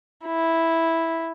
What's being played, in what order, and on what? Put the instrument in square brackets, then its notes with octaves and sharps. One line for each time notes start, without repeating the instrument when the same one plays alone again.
[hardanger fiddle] E4